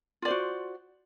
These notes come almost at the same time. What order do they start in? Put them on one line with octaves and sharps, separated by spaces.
F4 D5 C5 F#4